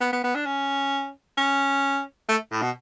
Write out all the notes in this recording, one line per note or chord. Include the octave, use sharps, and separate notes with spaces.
B3
B3
B3
D4
C#4
C#4
A3
A2
B2